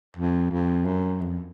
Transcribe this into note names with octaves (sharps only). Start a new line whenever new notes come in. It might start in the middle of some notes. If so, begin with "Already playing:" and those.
F2
F2
F#2
F2